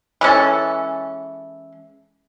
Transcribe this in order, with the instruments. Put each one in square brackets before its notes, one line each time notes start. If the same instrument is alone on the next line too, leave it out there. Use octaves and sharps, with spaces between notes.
[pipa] E3 G#3 C#4 A4